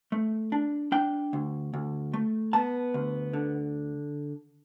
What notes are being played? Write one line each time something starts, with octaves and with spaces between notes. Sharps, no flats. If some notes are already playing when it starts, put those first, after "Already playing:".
A3
D4
D4 G5
D2
D2
A3
B3 A5
D2
D3